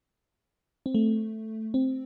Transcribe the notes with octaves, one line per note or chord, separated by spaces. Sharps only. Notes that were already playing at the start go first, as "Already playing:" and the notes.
C4
A3
C4